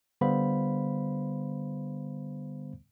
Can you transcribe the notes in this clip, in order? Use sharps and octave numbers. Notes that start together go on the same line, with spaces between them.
D3 G3 B3 C5 F5 B5